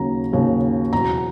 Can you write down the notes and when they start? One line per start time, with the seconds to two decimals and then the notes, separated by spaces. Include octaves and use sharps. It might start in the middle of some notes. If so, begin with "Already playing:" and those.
Already playing: D#2 C#3 F#3 A#5
0.33 D#2 C#3 F#3
0.93 E2 B2 F#3 A#5